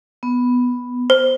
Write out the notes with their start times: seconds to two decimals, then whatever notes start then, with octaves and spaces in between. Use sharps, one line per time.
0.23 B3
1.10 C5